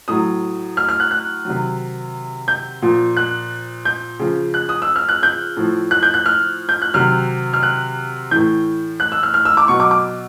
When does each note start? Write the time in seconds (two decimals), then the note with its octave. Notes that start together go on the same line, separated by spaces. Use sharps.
0.08 A2 F#3 D#6
0.77 F6
0.89 F6
1.00 F#6
1.11 F#6
1.45 C3 D#3 F#3
2.48 G6
2.82 A#2 F3
3.17 F#6
3.85 G6
4.19 C#3 F3
4.54 F#6
4.69 D#6
4.82 E6
4.96 F6
5.09 F#6
5.23 G6
5.57 A2 F3
5.91 F#6
6.03 G6
6.14 F#6
6.26 F6
6.69 G6
6.82 F#6
6.94 C3 D#3 F#3 F6
7.54 F6
7.63 F#6
8.31 A2 E3 G6
9.00 F#6
9.12 E6
9.23 F6
9.34 F6
9.45 E6
9.57 D6
9.68 B2 F#3 C#6
9.80 D6
9.91 D6